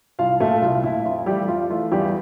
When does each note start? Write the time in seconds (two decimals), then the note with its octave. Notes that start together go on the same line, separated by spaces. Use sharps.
0.19 C2 F4 F5
0.40 A#2 A3 A4
0.62 C2 F4
0.83 A#2 A3 E4
1.05 F2 F4
1.26 E3 G3 A3 G4
1.48 F2 F4
1.70 E3 A3 F4
1.92 E2 G3 G4